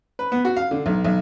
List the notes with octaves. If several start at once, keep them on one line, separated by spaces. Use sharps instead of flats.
B4
B3
F#4
F5
D3
B1
B1